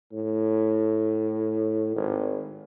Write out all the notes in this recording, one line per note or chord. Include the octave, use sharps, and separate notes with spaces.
A2
G#1